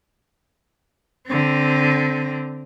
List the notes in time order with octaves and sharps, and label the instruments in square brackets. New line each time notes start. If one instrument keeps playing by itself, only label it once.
[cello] D3 C4